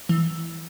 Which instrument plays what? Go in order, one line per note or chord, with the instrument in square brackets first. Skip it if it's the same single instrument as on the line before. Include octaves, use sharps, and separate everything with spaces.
[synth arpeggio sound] E3